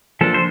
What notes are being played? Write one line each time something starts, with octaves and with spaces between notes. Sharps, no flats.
F3 A#3 D4 A4
C5